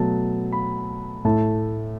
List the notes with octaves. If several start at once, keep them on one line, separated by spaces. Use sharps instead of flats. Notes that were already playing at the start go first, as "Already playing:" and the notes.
Already playing: B2 F#3 A3 A5
B5
A2 A3 A5